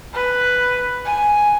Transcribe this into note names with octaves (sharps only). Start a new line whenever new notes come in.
B4
G#5